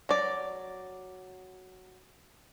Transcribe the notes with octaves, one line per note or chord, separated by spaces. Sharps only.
F#3 D5